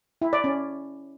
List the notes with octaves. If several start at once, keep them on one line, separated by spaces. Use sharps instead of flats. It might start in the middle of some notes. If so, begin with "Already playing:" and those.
E4
D5
C#4